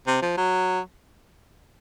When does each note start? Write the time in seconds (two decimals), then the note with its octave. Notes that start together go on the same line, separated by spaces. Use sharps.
0.07 C3
0.22 F3
0.37 F#3